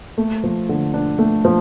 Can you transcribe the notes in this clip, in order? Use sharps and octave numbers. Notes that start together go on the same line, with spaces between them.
A3
F3
D3
D4
A3
F3